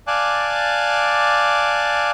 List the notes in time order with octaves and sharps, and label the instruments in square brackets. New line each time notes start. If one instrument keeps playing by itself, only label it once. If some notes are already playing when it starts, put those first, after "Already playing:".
[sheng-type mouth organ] D5 F5 G#5 A5 D6 F#6